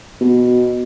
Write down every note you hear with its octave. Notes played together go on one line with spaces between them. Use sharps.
B2